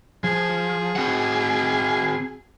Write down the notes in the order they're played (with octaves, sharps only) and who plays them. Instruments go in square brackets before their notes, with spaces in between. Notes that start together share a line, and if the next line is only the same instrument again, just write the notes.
[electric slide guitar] F3 [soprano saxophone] G#4
[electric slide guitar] C4 F#4 F#5